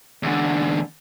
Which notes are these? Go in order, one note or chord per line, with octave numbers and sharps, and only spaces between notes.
E2 D3